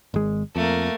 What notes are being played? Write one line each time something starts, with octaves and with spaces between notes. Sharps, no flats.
G#1 G#3
F2 A3 A#3